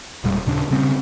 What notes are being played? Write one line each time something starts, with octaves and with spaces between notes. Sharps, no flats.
E1 A#2 G3
D#1 A#2 C#3 D4
C#3 G3 C4 C#4